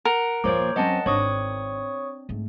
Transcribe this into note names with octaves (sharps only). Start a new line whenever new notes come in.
A#4 F#5
D#2 A#2 F3 A#3 C5 C#5 D6
F#3 C4 C#4 D#5 F#5 A5
G#1 C4 D4 C#5 C#6 D#6
G#2 A3